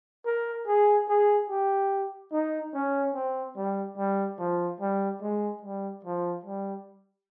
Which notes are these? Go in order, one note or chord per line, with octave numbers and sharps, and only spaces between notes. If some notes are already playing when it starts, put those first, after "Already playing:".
A#4
G#4
G#4
G4
D#4
C#4
C4
G3
G3
F3
G3
G#3
G3
F3
G3